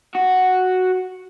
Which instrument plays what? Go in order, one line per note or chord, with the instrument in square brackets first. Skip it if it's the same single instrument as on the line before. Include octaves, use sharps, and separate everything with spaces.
[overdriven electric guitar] F#4